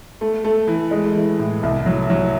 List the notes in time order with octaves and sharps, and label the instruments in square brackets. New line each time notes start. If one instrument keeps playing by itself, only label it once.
[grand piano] A3
A3
E3
G#3
E3
A2
C2
F#3
F#3